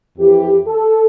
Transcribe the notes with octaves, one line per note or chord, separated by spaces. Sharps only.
F2 E3 G4
A4